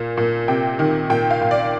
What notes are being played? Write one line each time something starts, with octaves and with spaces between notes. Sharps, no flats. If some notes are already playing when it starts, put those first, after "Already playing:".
Already playing: A#2
A#2
C3 G5
D#3
A#2 G5
F5
A#2
D5